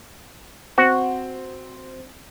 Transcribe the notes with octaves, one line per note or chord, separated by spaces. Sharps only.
C4 F#4